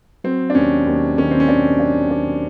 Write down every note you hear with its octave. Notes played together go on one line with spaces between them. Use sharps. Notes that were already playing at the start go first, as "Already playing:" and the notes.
F#3 C4
D4
D#2 C#4
D#2
D#3 C#4
C4
C#4
D#3 D4
F#3 D4
D#3 D4